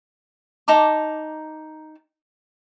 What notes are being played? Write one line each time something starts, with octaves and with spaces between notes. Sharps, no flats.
D#4 A5 A#5 D6